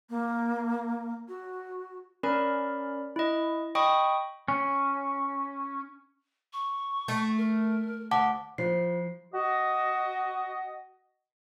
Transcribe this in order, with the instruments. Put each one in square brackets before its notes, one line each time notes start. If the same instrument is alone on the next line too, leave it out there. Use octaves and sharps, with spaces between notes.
[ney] A#3
F#4
[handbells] C#4 A#4 D5 B5
E4 D#5
D#5 G5 B5 C#6 D#6
[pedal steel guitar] C#4
[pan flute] C#6
[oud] A3
[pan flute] A#4
[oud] D2 [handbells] F#5 A5 D6
[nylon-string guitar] F3 [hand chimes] F4 C5 C7
[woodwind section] F#4 D#5